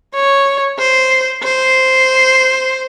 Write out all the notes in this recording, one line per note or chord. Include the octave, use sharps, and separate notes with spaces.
C#5
C5
C5